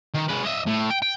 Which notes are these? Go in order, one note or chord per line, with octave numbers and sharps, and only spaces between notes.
D#3
G#3 B4
D#5 E5
A2
G5
G5